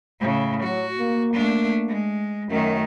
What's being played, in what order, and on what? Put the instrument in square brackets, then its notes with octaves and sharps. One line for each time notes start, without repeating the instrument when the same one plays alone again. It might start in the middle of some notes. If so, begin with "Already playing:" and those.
[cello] A2 C#3
[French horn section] F#3 [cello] F#4
[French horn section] A#3
[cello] A3 D4
G#3
[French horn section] F#2 [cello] D#3 A3